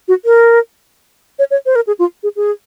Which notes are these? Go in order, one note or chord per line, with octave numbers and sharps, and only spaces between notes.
F#4
A#4
C#5
C#5
C5
A#4
G#4
F4
G#4
G#4